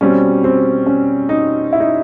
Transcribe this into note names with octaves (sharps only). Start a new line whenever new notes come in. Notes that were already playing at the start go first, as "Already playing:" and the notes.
B2 G3 C4 C#4
C4
C#4
D#4
E4
D#4